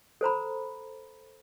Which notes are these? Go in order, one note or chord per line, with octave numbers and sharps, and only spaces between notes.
A4 C5 A#5 B5